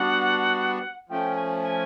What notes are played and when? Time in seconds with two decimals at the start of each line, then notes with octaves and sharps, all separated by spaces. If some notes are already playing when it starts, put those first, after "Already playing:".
Already playing: G3 B3 D4 F#4 F#5
1.09 F3 A3 C#4 G5
1.35 G#5
1.61 G#5